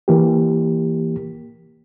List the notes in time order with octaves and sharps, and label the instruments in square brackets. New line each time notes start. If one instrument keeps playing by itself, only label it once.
[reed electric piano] E3 A#3 G4